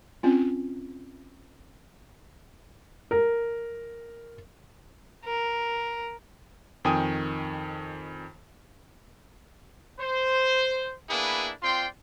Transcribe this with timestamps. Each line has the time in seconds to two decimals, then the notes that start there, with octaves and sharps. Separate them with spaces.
0.23 C4 C#4 F4
3.11 A#4
5.25 A#4
6.85 F2 D#3 G5 G#5 D#6
9.99 C5
11.09 A#3 B3 D4 E4 G#4 B4
11.62 C4 F4 D5 G5 C6